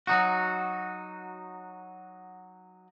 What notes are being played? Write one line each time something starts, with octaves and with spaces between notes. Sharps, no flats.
F#3 D#4 F#4